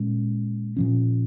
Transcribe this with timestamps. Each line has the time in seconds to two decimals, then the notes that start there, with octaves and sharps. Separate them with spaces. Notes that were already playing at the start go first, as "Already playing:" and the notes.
Already playing: A#2 G#3 C#4
0.76 A#2 F3 C#4